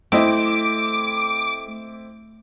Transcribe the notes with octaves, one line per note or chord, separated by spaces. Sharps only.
A3 C4 E4 D#5 D6